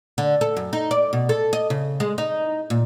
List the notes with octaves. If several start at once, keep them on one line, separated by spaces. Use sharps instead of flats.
D3
A4
F#2
D#4
D5
B2
A4
D#5
C#3
G#3
D#4
A#2